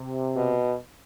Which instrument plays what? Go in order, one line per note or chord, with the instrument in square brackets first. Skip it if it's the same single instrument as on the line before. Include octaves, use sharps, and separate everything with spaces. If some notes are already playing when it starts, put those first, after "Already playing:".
Already playing: [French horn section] C3
[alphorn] B2